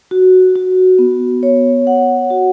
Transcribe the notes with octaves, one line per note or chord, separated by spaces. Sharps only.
F#4
F#4
B3
C#5
F#5
F#4